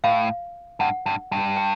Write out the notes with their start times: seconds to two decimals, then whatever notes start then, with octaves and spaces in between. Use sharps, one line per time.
0.04 A2 F5
0.80 G2 F#5
1.06 G2
1.32 G2
1.56 G5